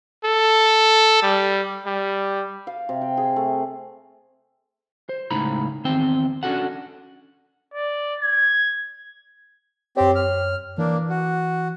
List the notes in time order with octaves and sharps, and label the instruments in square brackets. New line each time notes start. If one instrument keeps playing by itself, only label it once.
[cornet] A4
G3
G3
[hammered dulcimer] F5
C3
G5
G#4
A3
[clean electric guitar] C5
C#2 A2 D#4 A#5 B5
E2 D#3 C4 C5 G5
C#4 D4 F4 F#4 A4 F#5
[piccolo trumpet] D5
G#6
[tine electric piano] F#2 C#5 [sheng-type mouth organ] C4 G4
[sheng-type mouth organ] F6
[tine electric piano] E3 [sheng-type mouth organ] A#3 D4
[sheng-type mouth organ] F#4